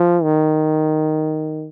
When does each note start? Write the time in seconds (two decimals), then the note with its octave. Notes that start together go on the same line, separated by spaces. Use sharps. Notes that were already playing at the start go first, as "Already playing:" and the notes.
Already playing: F3
0.23 D#3